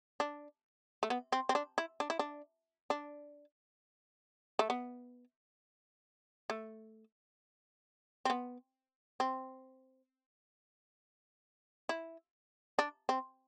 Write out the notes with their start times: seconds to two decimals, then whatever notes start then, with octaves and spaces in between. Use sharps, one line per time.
0.20 D4
1.03 A3
1.10 B3
1.32 C4
1.49 C4
1.55 D4
1.78 E4
2.00 D4
2.10 E4
2.19 D4
2.90 D4
4.59 A3
4.70 B3
6.50 A3
8.25 C4
8.30 B3
9.20 C4
11.89 E4
12.79 D4
13.09 C4